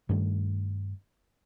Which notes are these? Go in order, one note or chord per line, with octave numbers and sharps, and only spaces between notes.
G2 D#3 A3 D4